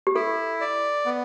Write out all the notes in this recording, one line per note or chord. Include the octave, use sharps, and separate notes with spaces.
G4
E4 A4
D5
B3